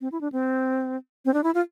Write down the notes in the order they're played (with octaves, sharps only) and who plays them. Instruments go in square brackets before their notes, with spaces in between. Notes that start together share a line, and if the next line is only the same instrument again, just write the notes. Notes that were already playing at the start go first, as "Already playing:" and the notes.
[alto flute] C4
E4
D4
C4
C4
D4
E4
F4